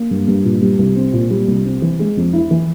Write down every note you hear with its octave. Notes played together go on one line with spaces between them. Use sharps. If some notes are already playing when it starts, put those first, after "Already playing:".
Already playing: A#3
G2
G2
A#2
G3
C2
C4
A#2
G3
C2
C4
E3
G#3
F2
E4
E3